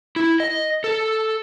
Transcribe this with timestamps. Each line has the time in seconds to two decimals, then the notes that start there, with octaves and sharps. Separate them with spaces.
0.16 E4
0.40 D#5
0.84 A4